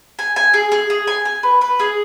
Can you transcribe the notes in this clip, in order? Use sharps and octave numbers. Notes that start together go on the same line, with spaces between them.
G#5
G#5
G#4
G#4
G#4
G#5
G#5
B4
B4
G#4